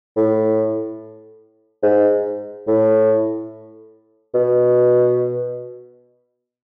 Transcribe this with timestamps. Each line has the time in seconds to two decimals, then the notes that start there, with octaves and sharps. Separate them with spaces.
0.17 A2
1.83 G#2
2.68 A2
4.35 B2